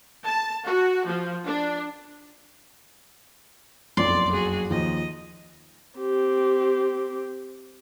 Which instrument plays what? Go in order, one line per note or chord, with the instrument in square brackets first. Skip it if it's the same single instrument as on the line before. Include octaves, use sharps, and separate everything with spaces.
[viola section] A5
F#4
F3
D4
[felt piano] F#1 B1 F2 [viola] D5 [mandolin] C6
[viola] F#4 G#4
[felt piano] D#2 F3 [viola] D#5
[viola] C4 G4